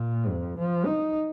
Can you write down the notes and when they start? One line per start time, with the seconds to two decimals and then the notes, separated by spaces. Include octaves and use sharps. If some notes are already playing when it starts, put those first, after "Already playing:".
Already playing: A#2
0.29 F2
0.58 F3
0.86 D#4